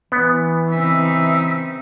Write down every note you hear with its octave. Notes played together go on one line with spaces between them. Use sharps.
E3 B3
C#3 C4 D#4 E5